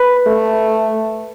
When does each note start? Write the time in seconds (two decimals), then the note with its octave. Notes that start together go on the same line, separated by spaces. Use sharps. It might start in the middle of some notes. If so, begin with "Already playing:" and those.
Already playing: B4
0.27 A3